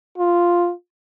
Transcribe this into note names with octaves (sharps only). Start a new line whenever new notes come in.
F4